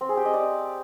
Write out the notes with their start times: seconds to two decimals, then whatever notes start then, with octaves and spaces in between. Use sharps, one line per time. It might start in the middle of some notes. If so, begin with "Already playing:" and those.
0.01 C4
0.09 G#4
0.17 G4
0.25 D#5
0.34 D5